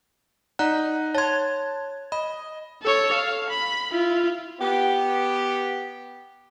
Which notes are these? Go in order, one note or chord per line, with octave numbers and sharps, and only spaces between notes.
D#4 D5 F#5 A#5 F#6
C#5 A5 C6 G#6
D#5 B5
A4 C#5
F5
B5
E4 F4
B3 G4